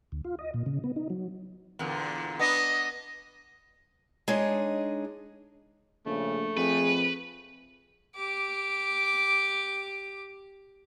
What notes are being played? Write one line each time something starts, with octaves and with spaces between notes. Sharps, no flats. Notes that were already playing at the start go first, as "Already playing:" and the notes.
D2
F4
D#5
A#2
C#3
B3
D#4
F#3
E2 A#2 D3
B3 D4 D#5
G#3 D4 D#4 G#4 C#5
A#1 C#3 A3
F2 G#4 B4
G4 D6